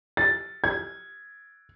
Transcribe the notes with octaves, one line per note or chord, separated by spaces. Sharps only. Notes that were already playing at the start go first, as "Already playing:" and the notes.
A6
G#6